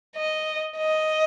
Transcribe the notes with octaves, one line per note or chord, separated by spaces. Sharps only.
D#5
D#5